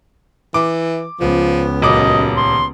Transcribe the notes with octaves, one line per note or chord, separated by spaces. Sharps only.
E3 D6
C#2 F3 B3
D#1 F#2 D#5 D6
C6